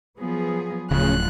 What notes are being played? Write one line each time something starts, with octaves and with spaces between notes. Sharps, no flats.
F3 F#3 B3 G#4
D1 C#3 F3 F#3 A3 F#6